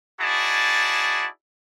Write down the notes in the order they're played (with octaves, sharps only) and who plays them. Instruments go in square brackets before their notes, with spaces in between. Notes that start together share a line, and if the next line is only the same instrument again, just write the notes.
[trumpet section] D#4 E4 F#4 G#4 D5 A5